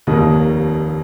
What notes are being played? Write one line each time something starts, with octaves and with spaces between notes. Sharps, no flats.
F1 D#2 D#3 A#3 D#4 D#6